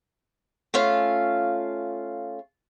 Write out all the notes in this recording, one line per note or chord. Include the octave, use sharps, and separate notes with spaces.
A3 C#4 F4 F5